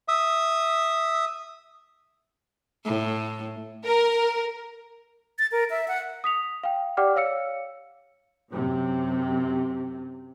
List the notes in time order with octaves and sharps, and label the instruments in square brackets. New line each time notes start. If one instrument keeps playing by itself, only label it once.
[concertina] E5 D#6
[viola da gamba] A2
[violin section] A#4
[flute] A6
A#4
E5
F#5
[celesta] D#6 B6 F7
F5 G5
G4 D5 F#5 G5 D6 F6
C#5 F5 E6 C#7
[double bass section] F#2 C3